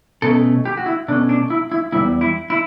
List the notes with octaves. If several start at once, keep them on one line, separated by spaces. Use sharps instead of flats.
B2 A3 C#4 A4
G4
F#4
E4
B2 A3 C#4 D4
D4
E4
E4
E2 B2 G3 E4
E4
E4